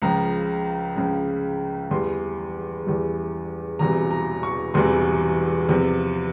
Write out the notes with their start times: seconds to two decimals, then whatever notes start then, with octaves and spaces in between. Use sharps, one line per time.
0.02 C#2 C#3 F3 A#5
0.96 C#2 C#3 F3
1.91 E2 E3 G3 C6
2.85 E2 E3 G3
3.79 E1 E2 C3 E3 G3 A#5
4.11 A#5
4.43 C#6
4.74 E1 E2 C3 E3 G3 C6
5.69 E2 C3 F3